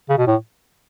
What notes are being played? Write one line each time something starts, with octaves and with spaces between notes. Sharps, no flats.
C#3
B2
A2